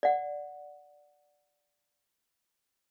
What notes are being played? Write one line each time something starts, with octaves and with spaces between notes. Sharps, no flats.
D5 F#5